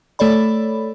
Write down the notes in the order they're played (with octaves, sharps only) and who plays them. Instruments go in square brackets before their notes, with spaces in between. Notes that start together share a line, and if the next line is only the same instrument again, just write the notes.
[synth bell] A3 A4 C#5 D5 B5